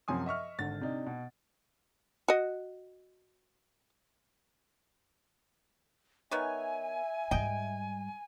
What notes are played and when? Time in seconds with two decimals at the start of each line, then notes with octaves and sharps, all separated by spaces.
0.08 F#2 C3 F3 G#5 C6 D#6
0.26 D#5 E5 C#6 F6
0.58 G#1 D3 A6
0.81 C3 D4 D#4
1.06 B2
2.28 F#4 D#5
6.31 D#3 B3 C#5 E5 G#5
7.31 G#2 G3 D#5 G5